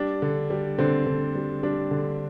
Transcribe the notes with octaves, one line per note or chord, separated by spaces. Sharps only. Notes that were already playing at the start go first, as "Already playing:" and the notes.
Already playing: G3 D4
D3
G3
D3 C4
D3
G3
G3 D4
D3